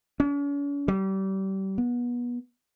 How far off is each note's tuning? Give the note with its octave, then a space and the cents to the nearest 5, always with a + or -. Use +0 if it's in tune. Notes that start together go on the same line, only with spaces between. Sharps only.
C#4 +45
G3 -30
B3 -30